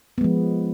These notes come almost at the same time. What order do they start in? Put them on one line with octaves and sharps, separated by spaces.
B3 G#3 F3